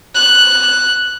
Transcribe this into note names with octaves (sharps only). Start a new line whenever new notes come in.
F#6